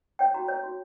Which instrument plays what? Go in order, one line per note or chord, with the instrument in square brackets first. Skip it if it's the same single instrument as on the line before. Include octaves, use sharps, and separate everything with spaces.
[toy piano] C#5 G5
F#4 A#5
C#5
F#4